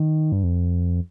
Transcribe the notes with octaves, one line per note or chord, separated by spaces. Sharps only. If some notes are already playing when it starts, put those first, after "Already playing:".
Already playing: D#3
G2
F2